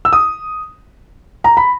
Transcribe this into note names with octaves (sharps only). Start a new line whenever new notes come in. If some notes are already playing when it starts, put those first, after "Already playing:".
E6
D#6
A#5
B5